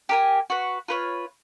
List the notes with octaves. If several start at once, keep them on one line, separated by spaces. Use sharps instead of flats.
G4 A#4 G#5
F#4 B4
F4 B4 C#5